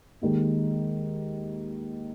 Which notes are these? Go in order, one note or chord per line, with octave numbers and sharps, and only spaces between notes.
D#2 D#3 G#3